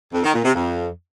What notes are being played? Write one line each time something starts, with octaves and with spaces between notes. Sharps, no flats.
F2
D#3
A#2
C3
F2